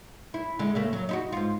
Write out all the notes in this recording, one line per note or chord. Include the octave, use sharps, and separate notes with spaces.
E4
D3 G#3
C#3 A3 A#3
F#3
D#4 E4 F#4
G#2 F4